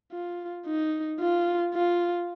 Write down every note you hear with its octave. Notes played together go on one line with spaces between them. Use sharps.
F4
D#4
F4
F4